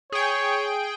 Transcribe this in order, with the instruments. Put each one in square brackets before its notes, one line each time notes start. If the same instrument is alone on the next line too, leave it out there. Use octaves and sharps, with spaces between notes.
[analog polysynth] G#4 G5 [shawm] C#5